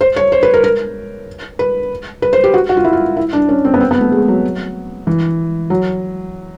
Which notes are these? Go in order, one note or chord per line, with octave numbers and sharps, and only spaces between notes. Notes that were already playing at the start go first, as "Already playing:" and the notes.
C5
C#5
C5
B4
A#4
A#4
B4
B4
C5
G4
F#4
F#4
F4
E4
F4
E4
D4
C#4
C4
B3
C4
B3
A3
G#3
F#3
E3
F#3